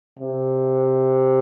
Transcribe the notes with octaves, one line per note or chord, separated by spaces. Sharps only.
C3